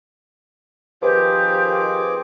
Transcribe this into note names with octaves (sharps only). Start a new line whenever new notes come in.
D#3 F3 C4 G4 G#4 B4 D6